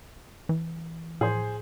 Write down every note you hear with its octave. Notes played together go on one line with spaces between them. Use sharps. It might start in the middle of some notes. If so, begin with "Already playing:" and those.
E3
A2 F3 G#4 C5